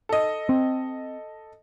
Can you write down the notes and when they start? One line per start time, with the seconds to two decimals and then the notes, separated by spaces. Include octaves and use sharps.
0.09 A4 D#5
0.49 C4